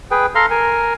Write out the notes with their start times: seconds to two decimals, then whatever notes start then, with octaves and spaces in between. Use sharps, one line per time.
0.11 G#4 B4 G5
0.35 A4 F5 A#5 C6 F6
0.50 A#4 G#5